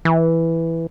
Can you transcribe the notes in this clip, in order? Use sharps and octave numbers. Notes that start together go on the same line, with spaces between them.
E3